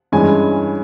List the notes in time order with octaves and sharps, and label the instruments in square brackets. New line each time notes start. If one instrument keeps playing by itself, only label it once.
[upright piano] G2 E3 G#3 C#4 G#5